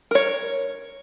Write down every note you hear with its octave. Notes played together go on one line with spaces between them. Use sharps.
A#4 C#5